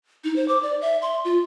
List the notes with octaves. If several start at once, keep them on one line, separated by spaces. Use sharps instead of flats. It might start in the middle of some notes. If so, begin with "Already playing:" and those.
D#4
C5
D6
D5
E5
C6
F4